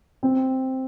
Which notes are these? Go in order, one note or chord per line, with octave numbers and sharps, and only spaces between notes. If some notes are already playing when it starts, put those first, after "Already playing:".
C4